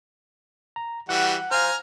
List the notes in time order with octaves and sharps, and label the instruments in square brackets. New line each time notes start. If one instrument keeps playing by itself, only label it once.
[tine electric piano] A#5
[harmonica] E3 G3 F#4 [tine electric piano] F#5
[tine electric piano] C5 F5 [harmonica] G#5 A#5 F6